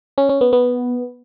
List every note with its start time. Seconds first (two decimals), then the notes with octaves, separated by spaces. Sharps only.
0.18 C#4
0.29 C#4
0.41 B3
0.53 B3